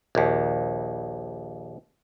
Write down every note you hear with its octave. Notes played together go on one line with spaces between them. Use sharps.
A#1 D#2